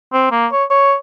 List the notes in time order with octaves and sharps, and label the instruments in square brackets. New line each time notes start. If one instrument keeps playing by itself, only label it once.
[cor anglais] C4
A#3
C#5
C#5